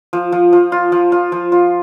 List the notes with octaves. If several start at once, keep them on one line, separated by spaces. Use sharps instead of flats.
F3
F3
F3
F4
F3
F4
F3
F4